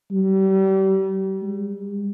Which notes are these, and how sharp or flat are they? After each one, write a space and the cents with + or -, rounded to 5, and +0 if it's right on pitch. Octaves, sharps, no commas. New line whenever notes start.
G3 -35
G3 +45